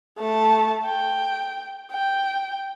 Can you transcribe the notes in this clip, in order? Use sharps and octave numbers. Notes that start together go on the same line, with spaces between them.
A3 A5
G5
G5